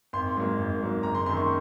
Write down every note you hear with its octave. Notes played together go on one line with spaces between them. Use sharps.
G#1 C6
G#2 F#3 A#3
G#1
G#2 F#3 A#3
F#1 A#5
C6
F#2 D#3 C6
C#6